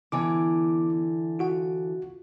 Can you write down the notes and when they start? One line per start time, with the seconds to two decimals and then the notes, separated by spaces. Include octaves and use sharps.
0.12 D3 E3 B3 D6
1.39 F4 F#4 F#5